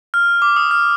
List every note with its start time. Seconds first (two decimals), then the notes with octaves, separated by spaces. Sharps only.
0.14 F6
0.42 D6
0.56 D#6
0.71 F6